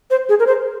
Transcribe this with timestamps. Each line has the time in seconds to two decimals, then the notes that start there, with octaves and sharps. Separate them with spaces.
0.11 C5
0.29 G#4
0.39 A#4
0.47 C5